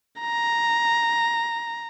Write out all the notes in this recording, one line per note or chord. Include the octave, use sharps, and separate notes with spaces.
A#5